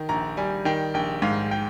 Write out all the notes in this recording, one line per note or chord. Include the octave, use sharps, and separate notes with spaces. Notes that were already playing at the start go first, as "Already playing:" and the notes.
Already playing: D#3
A#1 A#5
G3 G#5
D#3 G5
A#1 G5
G#2 F5
G5